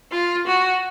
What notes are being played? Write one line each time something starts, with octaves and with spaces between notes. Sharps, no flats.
F4
F#4